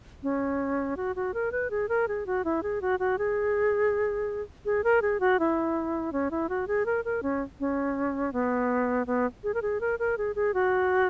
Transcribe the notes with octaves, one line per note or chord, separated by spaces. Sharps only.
C#4
F#4
F#4
A#4
B4
G#4
A#4
G#4
F#4
E4
G#4
F#4
F#4
G#4
G#4
A#4
G#4
F#4
E4
C#4
E4
F#4
G#4
A#4
A#4
C#4
C#4
B3
B3
G#4
A#4
G#4
A#4
A#4
G#4
G#4
F#4